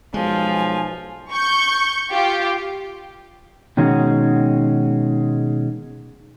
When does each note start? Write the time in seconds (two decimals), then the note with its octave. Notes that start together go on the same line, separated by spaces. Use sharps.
0.14 B1 F3 G#3 G#5
1.32 C#6 G6
2.12 F4 G4
3.77 B2 D#3 G#3 C#4 F#4